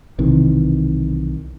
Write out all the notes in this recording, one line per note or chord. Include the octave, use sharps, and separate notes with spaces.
B1 C3 D#3 E3